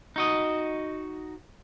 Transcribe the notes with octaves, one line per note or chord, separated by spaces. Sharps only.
D#4 F#4 D#5